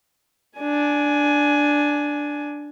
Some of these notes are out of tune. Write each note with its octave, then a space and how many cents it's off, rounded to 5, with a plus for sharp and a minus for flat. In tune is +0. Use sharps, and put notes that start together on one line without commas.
D4 +0 G#5 +15